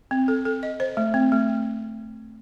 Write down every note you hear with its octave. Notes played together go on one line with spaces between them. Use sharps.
C4
A4
A4
D#5
C5
A3
C4
A3